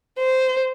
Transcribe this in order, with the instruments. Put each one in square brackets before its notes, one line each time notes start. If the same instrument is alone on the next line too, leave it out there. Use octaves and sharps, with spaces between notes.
[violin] C5